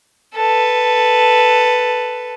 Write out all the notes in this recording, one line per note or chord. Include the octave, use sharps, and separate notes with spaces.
A4 B4